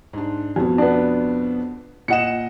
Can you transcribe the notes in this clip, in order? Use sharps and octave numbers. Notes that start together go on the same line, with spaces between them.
G#2 D4
F2 B2
B3 D4
A#2 D#5 F#5 C#7 E7